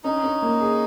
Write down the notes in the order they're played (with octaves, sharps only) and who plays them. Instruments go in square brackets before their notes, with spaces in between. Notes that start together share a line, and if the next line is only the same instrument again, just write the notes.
[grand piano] C#4 [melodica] D#4
[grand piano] C#4
A#3
G#4